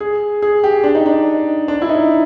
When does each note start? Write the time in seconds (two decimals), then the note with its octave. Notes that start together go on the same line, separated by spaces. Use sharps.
0.01 G#4
0.42 G#4
0.64 G4
0.84 D4
0.95 D#4
1.06 D4
1.68 D4
1.82 E4
1.89 D#4